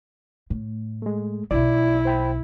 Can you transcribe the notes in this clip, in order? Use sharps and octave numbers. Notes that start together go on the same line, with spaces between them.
A2
G#3 A3
B1 B2 E4 D5
C5 G5 B5